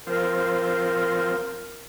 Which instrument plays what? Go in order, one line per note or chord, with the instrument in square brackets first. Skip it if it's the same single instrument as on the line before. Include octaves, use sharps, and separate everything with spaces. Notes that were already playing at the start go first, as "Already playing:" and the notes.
[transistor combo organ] F3 C4 [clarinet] A#4